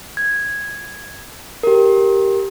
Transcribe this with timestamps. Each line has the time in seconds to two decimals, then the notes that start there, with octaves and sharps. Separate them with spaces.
0.17 G#6
1.63 G4 A#4